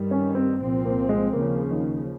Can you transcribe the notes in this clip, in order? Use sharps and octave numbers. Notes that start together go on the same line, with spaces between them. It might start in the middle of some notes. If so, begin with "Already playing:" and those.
Already playing: G2 D#3 G3
C#4
C4
C2 A#2 F3 C4
A#3
G#3
D#2 C#3 F3 A#3
D#3